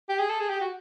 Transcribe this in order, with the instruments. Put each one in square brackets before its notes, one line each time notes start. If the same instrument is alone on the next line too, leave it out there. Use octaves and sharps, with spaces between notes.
[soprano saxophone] G4
G#4
A4
G#4
G4
F#4